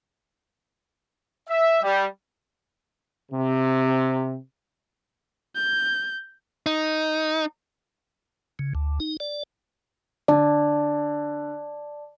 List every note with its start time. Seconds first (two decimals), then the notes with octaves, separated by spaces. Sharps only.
1.49 E5
1.83 G3
3.32 C3
5.55 G6
6.66 D#4
8.59 C#3
8.75 D2
9.00 D#4
9.20 D5
10.28 D3 D5 A5